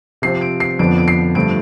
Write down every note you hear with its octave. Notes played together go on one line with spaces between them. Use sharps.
C3 F3 C4 C7
D7
C7
F2 D3 F3 B3 D4 D7
D7
C7
G2 D3 F3 A3 D7